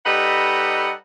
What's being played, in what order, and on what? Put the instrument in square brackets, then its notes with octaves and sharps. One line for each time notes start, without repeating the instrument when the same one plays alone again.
[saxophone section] G3 D#4 A4 B4 D#5 F#5